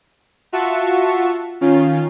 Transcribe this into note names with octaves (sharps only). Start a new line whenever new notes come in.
F4 F#4 E5 F#5 A5 C#6
D#3 C#4 F4